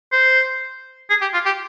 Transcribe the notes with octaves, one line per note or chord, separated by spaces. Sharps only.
C5
G#4
G4
F4
G4